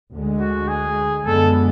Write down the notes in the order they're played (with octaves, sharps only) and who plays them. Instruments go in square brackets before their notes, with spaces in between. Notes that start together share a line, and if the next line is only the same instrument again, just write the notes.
[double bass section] D2 D3 G#3
[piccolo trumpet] F#4
G#4
[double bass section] F#2 D3 G#3 B3 [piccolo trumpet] A4